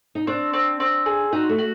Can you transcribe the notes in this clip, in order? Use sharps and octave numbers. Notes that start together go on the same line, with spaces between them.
D#4
C4 D4
C4
C4
G#4
D#4 F#4
A3
F#4